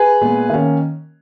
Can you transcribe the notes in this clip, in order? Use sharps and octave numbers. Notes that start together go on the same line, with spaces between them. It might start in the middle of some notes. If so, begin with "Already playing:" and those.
Already playing: G#4 B4
A#2 G#3 B3
D#3 A#3 C#4